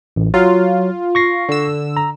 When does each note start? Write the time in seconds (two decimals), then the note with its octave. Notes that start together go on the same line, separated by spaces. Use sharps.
0.16 A1
0.34 F#3 F4
1.15 C#6 A#6 C7
1.49 D3 E6
1.97 A#5